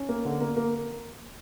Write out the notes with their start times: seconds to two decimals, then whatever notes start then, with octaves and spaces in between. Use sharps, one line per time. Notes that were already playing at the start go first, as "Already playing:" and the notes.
Already playing: C#4
0.09 A#3
0.25 D3
0.41 A#3
0.57 A#3